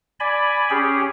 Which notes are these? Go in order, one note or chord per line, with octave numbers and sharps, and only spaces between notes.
D5 G#5 B5
C#4 G4 G#4